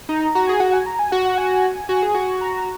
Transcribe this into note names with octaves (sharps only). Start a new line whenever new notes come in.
D#4 A#5
F#4 A#5
G#4 G#5
F#4 F#5
G#5
A#5
G#5
F#4 F#5
F#5
G#5
F#4
G#4
F#4
A#5